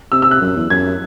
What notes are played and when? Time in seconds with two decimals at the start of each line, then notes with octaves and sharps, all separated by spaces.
0.12 C3 E6
0.22 E6
0.31 F#6
0.41 F#2
0.56 E2
0.70 F#2 G#6